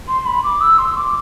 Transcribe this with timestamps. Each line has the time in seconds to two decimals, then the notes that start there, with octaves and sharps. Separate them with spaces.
0.08 C6
0.26 B5
0.44 D6
0.61 E6
0.78 C6
0.97 D6